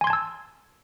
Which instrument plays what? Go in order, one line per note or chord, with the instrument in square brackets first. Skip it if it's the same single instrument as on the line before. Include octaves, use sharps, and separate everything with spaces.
[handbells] G#5
C6
G#6
A5
E6